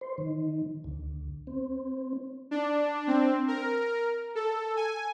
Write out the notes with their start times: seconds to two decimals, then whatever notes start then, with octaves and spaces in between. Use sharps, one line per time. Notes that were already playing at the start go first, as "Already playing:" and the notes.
0.01 C5
0.18 D#3
0.84 D2
1.47 C4
2.51 D4
3.08 C4
3.48 A#4
4.35 A4
4.77 G#5